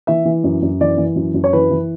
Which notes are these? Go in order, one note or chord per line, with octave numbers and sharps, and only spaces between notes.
E3 E5
E3
F#2
F#2
E3 D5
E3
F#2
F#2
C#5
E3 B4
E3